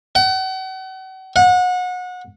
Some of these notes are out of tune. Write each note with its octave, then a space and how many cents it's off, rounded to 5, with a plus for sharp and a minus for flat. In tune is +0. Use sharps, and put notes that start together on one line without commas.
F#5 +40
F#5 -30